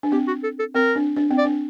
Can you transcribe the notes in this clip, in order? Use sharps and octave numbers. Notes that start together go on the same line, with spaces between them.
D4
C4 G4
F#4
A4
A4
C4 A#4
D4
D4
C4
D5
D4